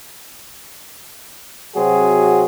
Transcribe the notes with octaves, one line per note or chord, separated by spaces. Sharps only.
C3 F#3 C4 F#4 G#4